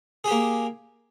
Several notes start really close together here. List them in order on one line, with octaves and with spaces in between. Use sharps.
G#4 G4 A#3